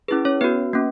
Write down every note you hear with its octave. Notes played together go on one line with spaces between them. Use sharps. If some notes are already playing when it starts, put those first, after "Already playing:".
C#4 E4 G#4 B4
C#4 C#5
B3 F#4 B4
A#3 C#4